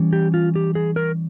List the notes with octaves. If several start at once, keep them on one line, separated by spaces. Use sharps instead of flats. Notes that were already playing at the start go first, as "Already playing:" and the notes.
Already playing: E3 G3 C#4
G4
F4
G4
G#4
A#4